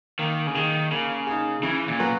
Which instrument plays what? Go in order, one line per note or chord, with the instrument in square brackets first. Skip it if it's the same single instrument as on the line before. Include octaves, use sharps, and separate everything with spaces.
[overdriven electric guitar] D#3 [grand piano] A#3
[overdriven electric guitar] C#3
[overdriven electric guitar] D#3 [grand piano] D#4 G#4
[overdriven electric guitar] C#3 [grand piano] A#3
[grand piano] D#4 G#4
[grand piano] C#3 [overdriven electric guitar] E3
[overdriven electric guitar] A#2
[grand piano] F#3 B3 F#4